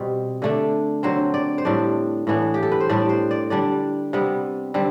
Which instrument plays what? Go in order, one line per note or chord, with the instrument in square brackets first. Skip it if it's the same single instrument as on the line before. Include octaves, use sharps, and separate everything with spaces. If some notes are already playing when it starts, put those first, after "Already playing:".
Already playing: [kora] B2 G3 C4
D3 A3 D4
D3 F#3 C4 C5
D5
C5
A2 G3 D4 D5
A2 E3 B3 D4
G4
A4
B4
C5
A2 G3 D4 D5
C5
D5
D3 G3 D4 D5
C3 G3 B3
D3 G3 C4